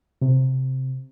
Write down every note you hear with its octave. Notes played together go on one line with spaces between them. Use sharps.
C3